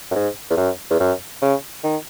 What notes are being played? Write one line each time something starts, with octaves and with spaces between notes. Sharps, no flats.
F#2
G#2
E2
F#2
E2
F#2
C#3
D#3